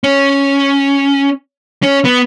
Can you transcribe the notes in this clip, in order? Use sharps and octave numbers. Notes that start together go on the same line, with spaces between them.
C#4
C#4
B3